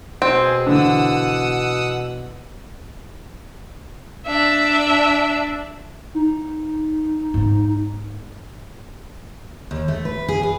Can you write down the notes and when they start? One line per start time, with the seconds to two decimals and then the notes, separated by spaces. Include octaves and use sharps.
0.22 B2 C4 G#4
0.66 D3 E3 F#5 D#6 E6
4.27 D4 E5
6.15 D#4
7.34 G#2 B3
9.71 D#2
9.88 A3
10.05 B4
10.28 G#4
10.43 B4